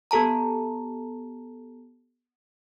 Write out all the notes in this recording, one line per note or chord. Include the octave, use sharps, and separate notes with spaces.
B3 G4 A4 A5 A#5